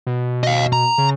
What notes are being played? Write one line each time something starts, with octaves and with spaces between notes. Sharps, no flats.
B2
D#5 F5
A#5
C#3